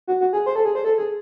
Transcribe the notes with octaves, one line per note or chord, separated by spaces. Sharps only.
F#4
F#4
G#4
C5
A4
G#4
C5
A4
G#4